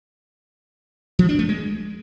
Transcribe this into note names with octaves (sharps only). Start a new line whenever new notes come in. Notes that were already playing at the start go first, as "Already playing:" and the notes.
F3
D4
A3
G#3